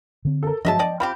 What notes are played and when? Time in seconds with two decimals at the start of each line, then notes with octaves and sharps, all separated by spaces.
0.25 D3 C4
0.43 A4 A#4
0.65 G1 F3 F#3 G#3 D#5 E5 A5
0.79 D5 D#5 G5
1.00 F3 C4 G4 B5